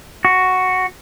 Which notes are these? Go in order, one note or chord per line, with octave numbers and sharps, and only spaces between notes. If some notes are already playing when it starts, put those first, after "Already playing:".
F#4